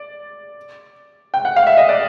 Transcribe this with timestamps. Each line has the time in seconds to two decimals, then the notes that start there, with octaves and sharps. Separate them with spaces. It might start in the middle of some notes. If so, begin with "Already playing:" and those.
Already playing: D5
1.34 G5
1.45 F#5
1.56 F5
1.67 E5
1.77 D#5
1.89 D5